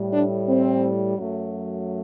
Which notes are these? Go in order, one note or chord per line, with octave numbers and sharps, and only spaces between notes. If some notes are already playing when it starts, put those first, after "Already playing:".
Already playing: A2 G3
D4
C4
F#2 F#3 A3